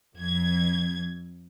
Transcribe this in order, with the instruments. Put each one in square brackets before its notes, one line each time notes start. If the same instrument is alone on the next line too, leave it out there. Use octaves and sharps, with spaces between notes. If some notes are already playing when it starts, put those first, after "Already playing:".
[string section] F2 G#6